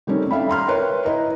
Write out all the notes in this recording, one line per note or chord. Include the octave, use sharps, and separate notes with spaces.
D#3 G3 A3 C4 C#4 D#4
A4 D5 E5 F5 G5 B5
A#5 C6 F6
A#4 B4 C#5 E5 G5
E4 B4 D#5 A#5